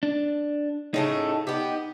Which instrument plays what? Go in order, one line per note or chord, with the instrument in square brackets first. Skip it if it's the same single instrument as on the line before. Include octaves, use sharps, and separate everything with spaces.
[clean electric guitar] D4
[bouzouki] A2 C#3 A3 [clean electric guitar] D#4
[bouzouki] B3 G4